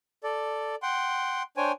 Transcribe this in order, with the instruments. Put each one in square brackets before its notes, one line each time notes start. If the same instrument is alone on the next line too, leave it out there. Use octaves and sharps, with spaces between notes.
[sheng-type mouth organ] A4 D5
F#5 G5 C6
D4 C5 C#5 G5 G#5